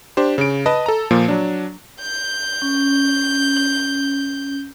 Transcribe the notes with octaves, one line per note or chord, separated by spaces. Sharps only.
D4 G4 C5
C#3 D7
B4 D#5 A5 D#6
A4 A#5
A#2 F3 A#3
F#3 D4
G6
C#4